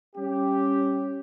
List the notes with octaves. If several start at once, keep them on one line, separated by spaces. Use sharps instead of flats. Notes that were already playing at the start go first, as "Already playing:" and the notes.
G3 C#4 G4